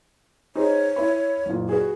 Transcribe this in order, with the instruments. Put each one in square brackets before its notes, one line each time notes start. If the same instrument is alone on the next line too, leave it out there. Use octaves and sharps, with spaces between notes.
[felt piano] D#4 G#4 C5 [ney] C#5
[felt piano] E4 B4 B5
F#1 A#2
[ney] F#4 [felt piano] G#4 B4